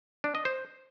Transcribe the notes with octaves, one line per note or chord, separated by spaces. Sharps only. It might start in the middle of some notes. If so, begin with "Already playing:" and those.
D4
D#5
C5